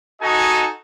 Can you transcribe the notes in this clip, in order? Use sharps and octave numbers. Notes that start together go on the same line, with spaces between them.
D#4 F#4 A4 D#5 G#5